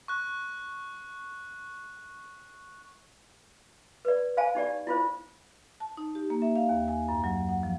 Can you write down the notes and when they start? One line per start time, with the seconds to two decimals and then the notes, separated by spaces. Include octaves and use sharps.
0.08 C#6 F#6
4.05 B4 D5
4.37 C5 F5 G#5 A5
4.55 D#4 G4 D5
4.87 E4 F4 C5
5.80 A5
5.97 D#4
6.15 G4
6.30 A#3
6.42 E5
6.56 F5
6.69 D#2
6.88 G#5
7.09 F#2
7.24 F#3
7.49 F#5
7.63 F3